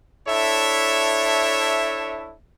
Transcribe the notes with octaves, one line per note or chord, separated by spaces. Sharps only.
D4 E4 A4 C#5 E5